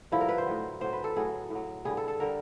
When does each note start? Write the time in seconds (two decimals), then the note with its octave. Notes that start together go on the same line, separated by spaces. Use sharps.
0.12 G2 D3 F3 E4
0.21 A#4
0.29 B4
0.38 C5
0.46 A2 F#3
0.81 A2 F#3 C5
0.93 B4
1.04 A4
1.16 A2 F#3 G#4
1.50 A2 F#3
1.85 G2 D3 G3 G#4
1.97 A4
2.08 A4
2.20 D3 G3 A#4